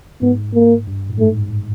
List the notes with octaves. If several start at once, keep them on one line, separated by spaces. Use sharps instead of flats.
G#2 B3
A#3
G2
A2
G#2 A3